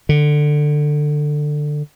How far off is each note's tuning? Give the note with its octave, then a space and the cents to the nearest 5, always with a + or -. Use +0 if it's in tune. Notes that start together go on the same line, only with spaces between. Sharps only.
D3 +15